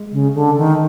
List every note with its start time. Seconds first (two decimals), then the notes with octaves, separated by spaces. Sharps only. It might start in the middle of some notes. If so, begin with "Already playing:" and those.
Already playing: G#3
0.12 C#3
0.35 D3
0.58 D#3